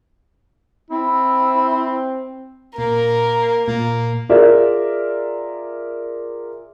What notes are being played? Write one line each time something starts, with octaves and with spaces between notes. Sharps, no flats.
C4 E4
A#2 A#3 A#4
A#2 A#3
F4 G#4 A#4 D5 E5